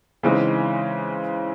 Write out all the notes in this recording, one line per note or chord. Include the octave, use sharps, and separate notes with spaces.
C#3 E3 G#3 C4 D#4